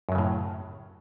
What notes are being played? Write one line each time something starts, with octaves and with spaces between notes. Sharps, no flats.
F#2 A2 C#3 F#3